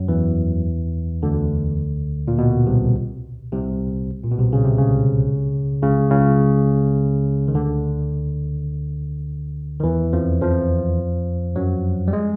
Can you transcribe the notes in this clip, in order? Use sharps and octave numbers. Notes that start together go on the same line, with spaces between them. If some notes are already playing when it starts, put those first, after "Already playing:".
Already playing: F#2 F#3
E2 E3
D2 D3
A#2
B2
C2 C3
C2 C3
A#2
B2
C2 C3
C#3
C3
C#2 C#3
C#2 C#3
C#2 C#3
D#3
D2 D3
D#3
E2 E3
F2 F3
F2 F3
F#2 F#3
G3
G#3